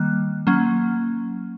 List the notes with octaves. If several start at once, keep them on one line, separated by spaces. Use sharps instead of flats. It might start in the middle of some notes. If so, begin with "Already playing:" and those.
Already playing: D#3 G3 A#3 F#6
F#3 A#3 C#4